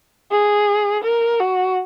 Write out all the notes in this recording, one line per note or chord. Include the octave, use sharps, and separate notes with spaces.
G#4
A#4
F#4